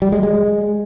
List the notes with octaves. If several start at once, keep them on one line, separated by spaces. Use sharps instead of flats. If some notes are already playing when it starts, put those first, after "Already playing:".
G3
G#3
G#3